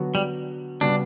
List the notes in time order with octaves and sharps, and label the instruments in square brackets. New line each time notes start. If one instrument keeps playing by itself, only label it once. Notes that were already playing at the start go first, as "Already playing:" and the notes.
Already playing: [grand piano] D3 F#3 B3 F#4
[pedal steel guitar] G3
[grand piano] C#3 G3 B3 F#4 [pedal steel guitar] D4